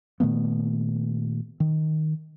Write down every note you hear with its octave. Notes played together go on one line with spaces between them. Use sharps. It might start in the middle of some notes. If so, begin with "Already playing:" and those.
A#2 D#3 A3 B3
D#3